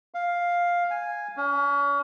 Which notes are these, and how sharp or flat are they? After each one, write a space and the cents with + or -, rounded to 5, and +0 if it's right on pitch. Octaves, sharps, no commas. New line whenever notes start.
F5 +5
G#5 -5
C#4 +35